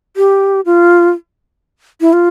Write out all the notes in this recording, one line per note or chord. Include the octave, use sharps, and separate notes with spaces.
G4
F4
E4
F4